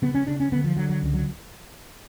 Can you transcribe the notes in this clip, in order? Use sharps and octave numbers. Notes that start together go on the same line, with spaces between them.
C#3 B3
C#4
C#3 D4
C#4
D3 B3
F3
D3 F#3
F#3
C#2
F#3